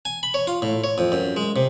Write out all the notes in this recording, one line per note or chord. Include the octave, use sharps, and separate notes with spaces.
G#5
B5
C#5
F4
A2
C#5
F2
F#2
G#3
C3